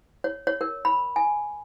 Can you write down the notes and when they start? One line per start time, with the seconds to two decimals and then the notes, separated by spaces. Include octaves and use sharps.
0.24 C#5
0.47 C#5
0.61 A#4
0.85 B5
1.16 G#5